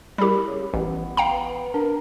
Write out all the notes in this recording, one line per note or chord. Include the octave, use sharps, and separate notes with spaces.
G3 E4 G4 A#4 B5
C#3
A1 B3
F5 G5 A#5
D4 A#4